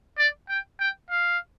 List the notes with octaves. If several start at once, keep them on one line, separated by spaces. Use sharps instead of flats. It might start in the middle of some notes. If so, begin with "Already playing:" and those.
D5
G5
G5
F5